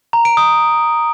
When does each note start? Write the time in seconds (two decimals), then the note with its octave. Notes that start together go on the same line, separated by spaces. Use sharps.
0.13 A#5
0.25 D7
0.37 D#6